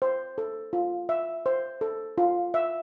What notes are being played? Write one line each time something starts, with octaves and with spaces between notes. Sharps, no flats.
C5
A4
F4
E5
C5
A4
F4
E5